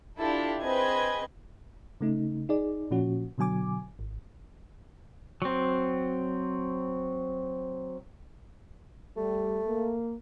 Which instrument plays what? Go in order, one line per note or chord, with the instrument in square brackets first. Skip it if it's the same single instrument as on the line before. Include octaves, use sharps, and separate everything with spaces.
[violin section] D4 E4 F4 G4 A4
C4 G#4 B4 D#5 G#6
[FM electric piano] C#3 A3 D#4
D#4 G#4 D5
A#2 F3 C#4 F#4
B2 D3 F#3 G#5 D6
G#1
[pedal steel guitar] F#3 C4
[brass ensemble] G3 [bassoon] A3
[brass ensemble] A#3